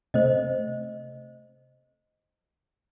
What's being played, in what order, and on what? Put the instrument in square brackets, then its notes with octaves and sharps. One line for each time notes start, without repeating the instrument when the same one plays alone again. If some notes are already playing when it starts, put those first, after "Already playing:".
[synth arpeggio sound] C3 A3 [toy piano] C5 D#5